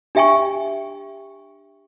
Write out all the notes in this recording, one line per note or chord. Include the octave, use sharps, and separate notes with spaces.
D4 G4 E5 G5 G#5 C#6